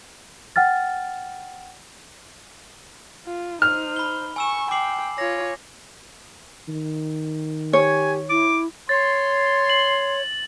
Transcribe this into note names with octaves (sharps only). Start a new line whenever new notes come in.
F#5 G5 F6 A6
F4
D#4 C5 F6
B5 G7
G#5 C#6 E6 E7
G5 D6 C7 F#7
F4 C#5 A#6
D#3
G4 C#5 G#5
E4 D6
C#5 C6 A6
F#7